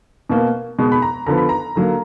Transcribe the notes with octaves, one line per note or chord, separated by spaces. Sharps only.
B2 A#3
B2 G#3 B3
B5
A#5
D3 F3 B3 A#5
B5
A#5
D3 F#3 A#3